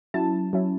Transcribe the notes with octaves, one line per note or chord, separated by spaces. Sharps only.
F#3 C#4 E4 A5
F#3 C#4 E4